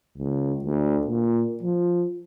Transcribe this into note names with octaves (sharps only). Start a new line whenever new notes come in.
C#2
D2
A#2
F3